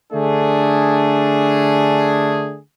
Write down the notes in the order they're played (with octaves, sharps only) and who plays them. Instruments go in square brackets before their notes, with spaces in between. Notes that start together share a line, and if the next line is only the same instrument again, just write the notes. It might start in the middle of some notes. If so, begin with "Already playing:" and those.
[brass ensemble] D3 A3 D4 G#4